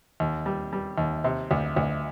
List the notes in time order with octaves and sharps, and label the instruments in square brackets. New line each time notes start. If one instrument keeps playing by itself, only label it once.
[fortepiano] D#2
G3
G3
D#2
C3
D2
D2